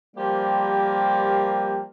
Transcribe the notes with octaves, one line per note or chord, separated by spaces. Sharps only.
F3 G3 A#3 G4 A#4 C5